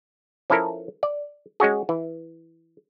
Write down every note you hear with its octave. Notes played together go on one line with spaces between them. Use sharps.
F3 C#4 E4 A4 A#4
D5
G#3 C#4 F#4 G#4
E3